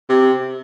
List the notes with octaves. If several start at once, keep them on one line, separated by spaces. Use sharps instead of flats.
C3